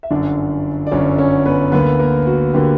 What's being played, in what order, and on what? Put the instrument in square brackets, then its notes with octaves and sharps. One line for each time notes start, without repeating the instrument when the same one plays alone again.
[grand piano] E5
G1 F#2 D3 D4 D5
D5
G1 F#2 D3 C#4 C#5
C#4 C#5
B3 B4
D2 D3 A#3 B3 B4
A#3 A#4
F#4
D3 A#3 G4